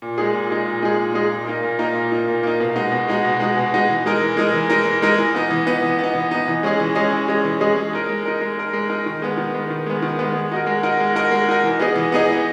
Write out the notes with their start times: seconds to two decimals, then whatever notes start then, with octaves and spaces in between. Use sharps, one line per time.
0.02 A#2
0.18 G#3 D#4 G#4
0.34 A#2
0.50 G#3 D#4 G#4
0.66 A#2
0.82 G#3 D#4 G#4
0.98 A#2
1.14 G#3 D#4 G#4
1.31 A#2
1.47 A#3 D#4
1.63 A#2
1.79 A#3 D#4
1.95 A#2
2.12 A#3 D#4
2.28 A#2
2.43 A#3 D#4
2.60 B2
2.76 G#3 D#4 F#4
2.92 B2
3.08 G#3 D#4 F#4
3.24 B2
3.40 G#3 D#4 F#4
3.57 B2
3.74 G#3 D#4 F#4
3.89 E3
4.06 G#3 D#4 A#4
4.21 E3
4.37 G#3 D#4 A#4
4.53 E3
4.70 G#3 D#4 A#4
4.86 E3
5.02 G#3 D#4 A#4
5.19 E3
5.35 B3 D#4
5.51 E3
5.67 B3 D#4
5.83 E3
5.99 B3 D#4
6.15 E3
6.31 B3 D#4
6.48 E3
6.63 G#3 C#4 G#4 D#5
6.80 E3
6.95 G#3 C#4 G#4 D#5
7.12 E3
7.28 G#3 C#4 G#4 D#5
7.44 E3
7.60 G#3 C#4 G#4 D#5
7.76 G#3
7.93 D#4 A#4
8.09 G#3
8.25 D#4 A#4
8.41 G#3
8.58 D#4 A#4
8.73 G#3
8.90 D#4 A#4
9.06 D#3
9.22 G#3 B3
9.37 D#3
9.54 G#3 B3
9.70 D#3
9.86 G#3 B3
10.02 D#3
10.19 G#3 B3
10.35 G#3
10.51 D#4 F#4 A#4
10.67 G#3
10.83 D#4 F#4 A#4
11.00 G#3
11.15 D#4 F#4 A#4
11.32 G#3
11.48 D#4 F#4 A#4
11.64 E3
11.80 B3 D#4 G#4 D#5
11.96 E3
12.12 B3 D#4 G#4 D#5
12.29 E3